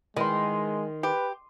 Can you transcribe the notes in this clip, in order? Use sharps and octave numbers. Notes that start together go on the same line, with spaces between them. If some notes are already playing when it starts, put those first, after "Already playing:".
D#3 E3 G#3 C6 D#6
G4 B4